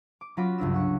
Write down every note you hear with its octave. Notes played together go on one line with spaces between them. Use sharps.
D6
F#3 C#4 F4 F#4 B5 D6
G1 C#2 D4 E6
F#5 C#6